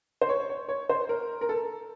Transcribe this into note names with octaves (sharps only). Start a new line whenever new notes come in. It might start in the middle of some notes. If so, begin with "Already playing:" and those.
C5
C#5
C#5
C#5
C5
A#4
A#4
A4